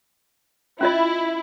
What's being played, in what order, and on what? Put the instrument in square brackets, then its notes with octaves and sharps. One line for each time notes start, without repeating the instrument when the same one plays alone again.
[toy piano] C#4 F4 D#5 [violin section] E4